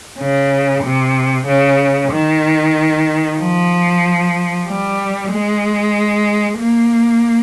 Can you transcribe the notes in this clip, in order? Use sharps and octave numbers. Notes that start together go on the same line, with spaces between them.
C#3
C3
C#3
D#3
F3
G3
G#3
A#3